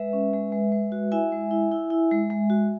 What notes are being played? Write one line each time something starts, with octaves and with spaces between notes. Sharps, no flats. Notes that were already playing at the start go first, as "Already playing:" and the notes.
Already playing: G#3 B4 E5
C#4
G#3
G#3
G#3
F#4
E4 E5 G#5
G#3
E4
E4
E4
G#3
G#3
F#4